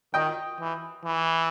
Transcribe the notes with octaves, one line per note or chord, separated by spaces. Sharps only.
D#3 D#5 G5
E3
E3